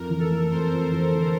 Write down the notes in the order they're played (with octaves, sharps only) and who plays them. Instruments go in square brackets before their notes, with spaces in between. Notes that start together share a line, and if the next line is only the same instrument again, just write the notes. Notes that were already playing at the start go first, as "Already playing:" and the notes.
Already playing: [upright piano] F2 [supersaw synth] A#4
[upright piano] E3
[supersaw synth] A4
[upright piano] A3
[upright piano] F2 [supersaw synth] C5
[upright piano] F2
E3
D3